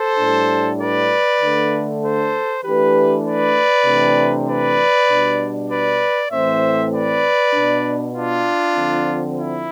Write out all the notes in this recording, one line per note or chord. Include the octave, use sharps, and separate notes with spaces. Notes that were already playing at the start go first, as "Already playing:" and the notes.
Already playing: A4 C5
A2 G3 D4
B4 D5
D3 A3 D4
A4 C5
E3 A3 D4 G4 B4
B4 D5
C3 E3 A3 D4
B4 D5
B2 G3 D4
B4 D5
A2 E3 A3 C4 C5 E5
B4 D5
B2 B3 D4
D4 F4
D3 F3 C4
E4